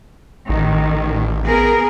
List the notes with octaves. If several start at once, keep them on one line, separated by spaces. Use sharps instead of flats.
A1 D#3
B3 G#4 A#4